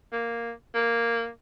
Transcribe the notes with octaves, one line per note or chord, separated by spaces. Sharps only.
A#3
A#3